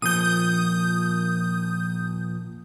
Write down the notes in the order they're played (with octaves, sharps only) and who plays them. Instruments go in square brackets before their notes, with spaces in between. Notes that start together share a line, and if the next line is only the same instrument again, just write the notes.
[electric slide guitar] A#2 D#3 F3 [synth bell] D#6 G6